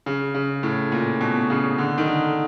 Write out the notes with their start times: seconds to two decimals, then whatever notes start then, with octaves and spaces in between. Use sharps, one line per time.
0.06 C#3
0.35 C#3
0.63 A2
0.92 A#2
1.21 B2
1.50 C#3
1.78 D3
1.98 D#3
2.07 D3